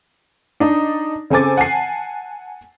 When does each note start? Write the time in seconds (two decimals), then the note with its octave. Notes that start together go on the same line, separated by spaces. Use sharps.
0.60 D4 D#4
1.30 C#3 C4 A4 G#5 D6 A6
1.57 F#5 G#5 A5 C7